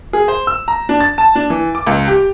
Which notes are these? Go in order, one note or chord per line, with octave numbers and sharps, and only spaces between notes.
G#4
C5
E6
A#5
D4
A6
A5
D4
E3
D6
C#2
G4